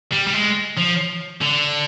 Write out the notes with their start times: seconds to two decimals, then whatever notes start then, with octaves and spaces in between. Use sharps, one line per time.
0.12 G3
0.27 G3
0.33 G#3
0.78 F3
1.42 D3